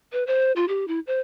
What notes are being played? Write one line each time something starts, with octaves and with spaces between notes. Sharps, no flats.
B4
C5
F4
G4
E4
C5